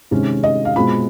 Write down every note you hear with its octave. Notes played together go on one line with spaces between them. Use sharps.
C3 D#3 G#3 C#4
D#5
F5
B2 G#3 C4 F4 B5